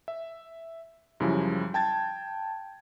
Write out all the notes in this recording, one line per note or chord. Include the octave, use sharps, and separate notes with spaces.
E5
F#2 C#3 F3 G3 E4
G5 A5 G#6 A6